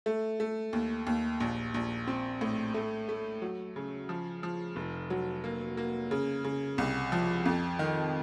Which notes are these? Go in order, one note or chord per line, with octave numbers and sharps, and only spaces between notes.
A3
A3
D#2
D#2
A#1
A#1
C4
A2
A3
A3
F#3
C#3
F3
F3
F1
F#3
A#3
A#3
C#3
C#3
C2
F3
F2
D#3